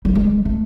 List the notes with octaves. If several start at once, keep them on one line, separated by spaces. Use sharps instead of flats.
G3
G#3
A3